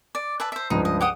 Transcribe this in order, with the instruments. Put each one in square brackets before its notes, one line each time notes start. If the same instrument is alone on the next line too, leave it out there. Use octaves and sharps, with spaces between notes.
[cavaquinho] D5
B4 E5 A5
C5 E5
[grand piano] C#2 G2 F3 [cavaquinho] D#4
[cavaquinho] D#5
G4 F#5 D#6